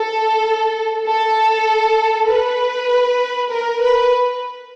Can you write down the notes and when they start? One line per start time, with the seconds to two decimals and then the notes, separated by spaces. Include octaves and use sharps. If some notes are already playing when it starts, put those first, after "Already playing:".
Already playing: A4
1.06 A4
2.29 B4
3.52 A#4
3.83 B4